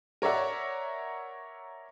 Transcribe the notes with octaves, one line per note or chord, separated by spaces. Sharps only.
A#4 C#5 D5 E5 F#5